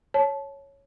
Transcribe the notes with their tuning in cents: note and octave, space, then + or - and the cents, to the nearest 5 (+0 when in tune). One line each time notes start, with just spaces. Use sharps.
C#5 +0 A5 -20